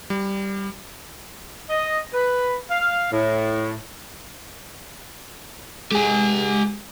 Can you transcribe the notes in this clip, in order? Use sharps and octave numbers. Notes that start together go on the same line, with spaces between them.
G3
D#5
B4
F5
A2
G#3 G4 G#5